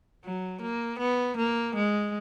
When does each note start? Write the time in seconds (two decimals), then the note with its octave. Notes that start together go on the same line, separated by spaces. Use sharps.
0.24 F#3
0.62 A#3
0.99 B3
1.37 A#3
1.75 G#3